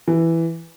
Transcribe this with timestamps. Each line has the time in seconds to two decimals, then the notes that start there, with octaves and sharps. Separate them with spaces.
0.08 E3